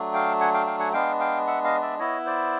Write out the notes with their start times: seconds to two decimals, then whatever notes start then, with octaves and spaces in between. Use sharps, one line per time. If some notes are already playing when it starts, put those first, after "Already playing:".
Already playing: F#3 A3 D4
0.14 F5 G5
0.40 F#5 G#5
0.53 F5 G5
0.66 F5 G5
0.80 F#5 G#5
0.93 G#3 B3 D4 F5 G5
1.20 F5 G5
1.47 E5 F#5
1.64 D#5 F5
1.82 D5 E5
1.99 B3 E4 C#5 D#5
2.26 C5 D5